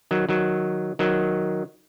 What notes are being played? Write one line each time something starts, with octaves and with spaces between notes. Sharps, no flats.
D#3 F#3
D#3 F#3
D#3 F#3